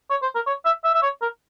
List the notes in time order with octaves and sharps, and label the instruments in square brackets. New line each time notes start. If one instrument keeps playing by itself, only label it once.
[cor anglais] C#5
C5
A#4
C#5
E5
E5
E5
C#5
A#4